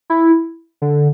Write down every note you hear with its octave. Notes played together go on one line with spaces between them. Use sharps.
E4
D3